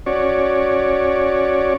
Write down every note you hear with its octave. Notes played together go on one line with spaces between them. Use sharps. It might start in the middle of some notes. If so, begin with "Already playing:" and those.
C#4 F#4 C#5 D5